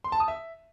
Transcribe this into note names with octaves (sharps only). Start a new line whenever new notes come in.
C6
A5
D#6
E5